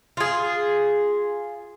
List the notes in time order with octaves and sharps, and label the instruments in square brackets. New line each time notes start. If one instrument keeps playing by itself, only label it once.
[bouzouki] F4 G#4